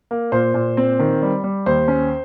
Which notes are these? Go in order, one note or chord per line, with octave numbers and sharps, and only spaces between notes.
A#3
A#2 C5
A#2
C4
D#3
G3
G3
D#2 C5
C#4